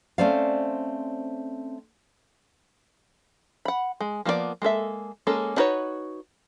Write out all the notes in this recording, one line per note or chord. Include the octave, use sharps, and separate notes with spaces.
A3 C4 C#4 C5 D5 F5
F#5 B5
G#3
F3 A#3 B3 F4 D5
G#3 A#3 A4 E5
G#3 A#3 C#4 A4
D4 D#4 F#4 B4 C#5